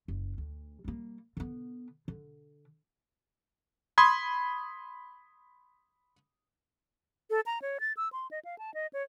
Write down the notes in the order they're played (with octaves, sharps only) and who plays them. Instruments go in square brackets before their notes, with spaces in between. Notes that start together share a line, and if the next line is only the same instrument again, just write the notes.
[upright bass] F#1
D2
G3 A#3
D3 B3
D3
[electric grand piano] B5 C6 D#6 G#6
[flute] A4
A#5
C#5
A6
E6
C6
D#5
F5
A5
D#5
C#5